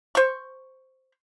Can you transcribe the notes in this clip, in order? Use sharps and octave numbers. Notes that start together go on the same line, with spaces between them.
C5 C#6